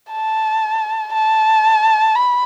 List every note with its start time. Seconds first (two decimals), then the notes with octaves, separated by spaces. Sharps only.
0.12 A5
1.13 A5
2.16 B5